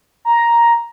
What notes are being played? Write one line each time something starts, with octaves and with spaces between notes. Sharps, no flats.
A#5